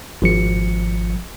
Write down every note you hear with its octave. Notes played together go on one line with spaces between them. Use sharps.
G#1 F3 C#7